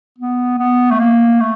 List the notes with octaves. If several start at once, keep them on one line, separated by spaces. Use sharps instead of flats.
B3
B3
A3
A#3
A3